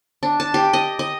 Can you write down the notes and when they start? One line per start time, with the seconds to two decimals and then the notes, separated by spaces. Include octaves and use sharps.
0.23 D4
0.40 A5
0.54 G4
0.73 D#5
0.99 D#5